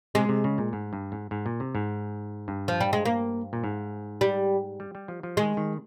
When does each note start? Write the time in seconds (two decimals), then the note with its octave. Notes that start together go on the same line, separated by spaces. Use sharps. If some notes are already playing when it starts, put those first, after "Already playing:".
0.15 C3 G#3
0.29 C3
0.44 C#3
0.58 A#2
0.73 G#2
0.93 G2
1.12 G#2
1.31 G#2
1.46 A#2
1.60 C3
1.75 G#2
2.48 G2
2.68 F3
2.81 G3
2.93 G#3
3.05 A#3
3.53 A#2
3.64 G#2
4.21 G3
4.80 G3
4.95 G3
5.08 F3
5.23 F3
5.37 D#3 G#3
5.57 D#3